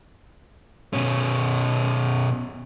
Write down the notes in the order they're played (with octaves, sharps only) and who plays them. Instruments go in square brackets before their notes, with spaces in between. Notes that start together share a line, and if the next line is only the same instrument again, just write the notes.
[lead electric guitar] B2 C#4